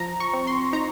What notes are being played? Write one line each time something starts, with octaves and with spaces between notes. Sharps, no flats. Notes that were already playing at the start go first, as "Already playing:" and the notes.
Already playing: F3 A#5
C#6
C4
C6
D#4 A#5